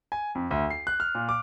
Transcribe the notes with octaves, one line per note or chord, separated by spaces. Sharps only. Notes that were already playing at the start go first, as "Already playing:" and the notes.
G#5
F2
D2
C7
F#6
F6
A#2
D6